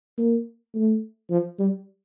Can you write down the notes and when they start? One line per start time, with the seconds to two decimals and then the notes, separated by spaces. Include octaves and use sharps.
0.18 A#3
0.75 A3
1.30 F3
1.59 G3